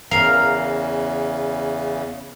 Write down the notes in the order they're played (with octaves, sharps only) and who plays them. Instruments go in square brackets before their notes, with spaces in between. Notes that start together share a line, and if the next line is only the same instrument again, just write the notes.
[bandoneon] E2 C#3 [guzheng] A#4 F5